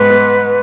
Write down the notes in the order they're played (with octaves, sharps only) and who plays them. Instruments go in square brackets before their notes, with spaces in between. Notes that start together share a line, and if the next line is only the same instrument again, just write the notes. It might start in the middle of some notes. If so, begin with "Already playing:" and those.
Already playing: [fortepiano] G#2 G#3 B3 [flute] B4
[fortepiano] B3